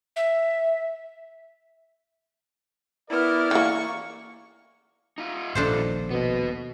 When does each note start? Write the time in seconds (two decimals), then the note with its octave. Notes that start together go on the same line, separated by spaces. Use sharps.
0.16 E5
3.09 B3 E4 A#4 D5 F6
3.51 E3 A#3 C#6
5.18 D#4 F4
5.55 D#1 A#1 D#2 D4 A4 C5
6.11 B2 B3 D#5